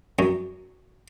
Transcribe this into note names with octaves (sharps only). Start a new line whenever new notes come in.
F#2